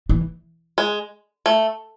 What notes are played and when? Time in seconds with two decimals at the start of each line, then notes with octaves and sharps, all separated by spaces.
0.09 E3
0.78 G#3
1.46 A3